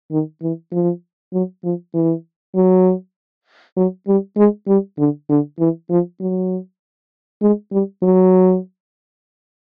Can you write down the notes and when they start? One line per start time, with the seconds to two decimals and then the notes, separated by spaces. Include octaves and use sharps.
0.12 D#3
0.42 E3
0.72 F3
1.33 F#3
1.64 F3
1.94 E3
2.56 F#3
3.77 F#3
4.07 G3
4.37 G#3
4.67 G3
4.98 D3
5.29 D3
5.59 E3
5.90 F3
6.20 F#3
7.42 G#3
7.72 G3
8.02 F#3